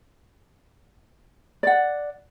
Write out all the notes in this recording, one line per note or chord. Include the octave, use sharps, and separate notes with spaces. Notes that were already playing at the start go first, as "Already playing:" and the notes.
D5 F#5